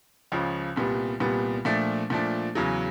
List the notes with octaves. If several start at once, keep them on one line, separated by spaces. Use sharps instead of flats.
C#2 C#3 F3
C2 A#2 G3 B3
C2 A#2 G3 B3
A#2 F3 A3 D4
A#2 F3 A3 D4
E2 C#3 F#3